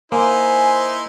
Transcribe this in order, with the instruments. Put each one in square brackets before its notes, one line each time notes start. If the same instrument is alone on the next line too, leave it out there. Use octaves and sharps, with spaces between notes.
[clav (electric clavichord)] A#3 [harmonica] D#4 E4 C6 [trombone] C5 [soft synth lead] G#5